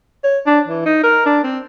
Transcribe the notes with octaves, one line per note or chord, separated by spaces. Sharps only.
C#5
D4
E3
D#4
A#4
D4
C4